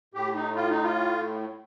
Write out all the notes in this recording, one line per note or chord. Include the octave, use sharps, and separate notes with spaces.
A2 G4
D#4
F4
D#4
F4